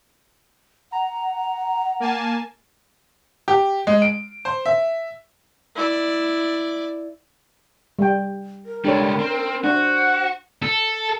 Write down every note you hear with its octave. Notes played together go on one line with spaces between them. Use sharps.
F#5 A#5
A#3 G#5 A5
G4
G#3
D7
C5
E5
E4 D5
G3 G5
A#4
C#2 G3 D4 A4 C#5
C4
D4 F#4 C5 F#5
A4